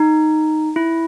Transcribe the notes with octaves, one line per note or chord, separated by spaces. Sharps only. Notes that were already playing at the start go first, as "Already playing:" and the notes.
Already playing: D#4
E4